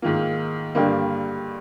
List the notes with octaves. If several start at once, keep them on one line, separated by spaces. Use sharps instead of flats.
G#2 D#3 A#3 F4
G2 D3 G3 A#3